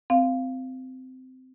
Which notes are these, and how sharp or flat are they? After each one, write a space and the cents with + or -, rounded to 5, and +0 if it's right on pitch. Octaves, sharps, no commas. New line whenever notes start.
C4 -20 F5 -5